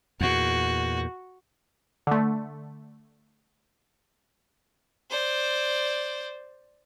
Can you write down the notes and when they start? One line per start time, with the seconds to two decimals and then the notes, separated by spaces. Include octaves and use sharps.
0.21 E2 A#2 F#4
2.07 D3 A3
5.10 C5 D5